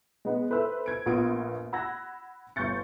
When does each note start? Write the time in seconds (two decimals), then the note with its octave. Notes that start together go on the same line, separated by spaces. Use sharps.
0.25 G#3 B3
0.50 A4 B4 C5 E5 E6
0.86 G#6 D7
1.06 A#1 B3 F4 D#6 D7
1.73 F#5 B5 E6 F#6 G#6 A#6
2.56 G1 C#6 G6 A6 C#7